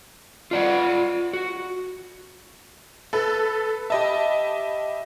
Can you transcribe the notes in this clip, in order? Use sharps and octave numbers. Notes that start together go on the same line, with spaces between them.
F4 D5 F#5
F#4
A4 B4
G4 D#5 E5 A5 B5